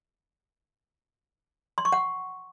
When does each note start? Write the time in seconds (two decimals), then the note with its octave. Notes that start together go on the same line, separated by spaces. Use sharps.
1.78 C6
1.85 C#6
1.92 F#5